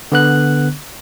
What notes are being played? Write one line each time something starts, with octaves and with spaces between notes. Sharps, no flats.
D3 B3 F#6